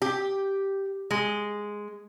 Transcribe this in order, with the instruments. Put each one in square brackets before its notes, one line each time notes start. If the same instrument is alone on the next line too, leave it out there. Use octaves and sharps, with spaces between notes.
[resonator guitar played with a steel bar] G4
G#3